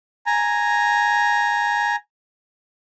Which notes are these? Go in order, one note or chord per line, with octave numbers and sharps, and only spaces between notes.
G#5 A#5